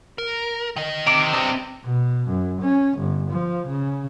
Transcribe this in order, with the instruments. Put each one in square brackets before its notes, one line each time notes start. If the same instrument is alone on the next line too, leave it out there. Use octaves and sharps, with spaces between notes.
[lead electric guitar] A#4
D#3 D#5
[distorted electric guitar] C3 [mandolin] D6
[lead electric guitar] C4 D4 [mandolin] B4 D#5
[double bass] B2
F#2
C#4
G1
F3
C#3